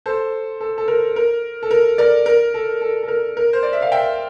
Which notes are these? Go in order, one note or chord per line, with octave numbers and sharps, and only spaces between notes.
A4 C5
A4
A4
A#4
A#4
A4
A#4
A#4 D5
A#4
A4
A4
A4
A#4
A#4
C5
D5
E5
F5
E5 G5